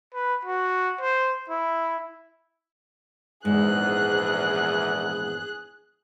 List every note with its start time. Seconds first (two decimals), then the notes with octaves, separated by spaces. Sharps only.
0.14 B4
0.45 F#4
1.01 C5
1.50 E4
3.45 A#1 E2 G#2 G#4 F#6